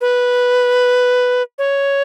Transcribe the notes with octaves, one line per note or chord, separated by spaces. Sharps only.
B4
C#5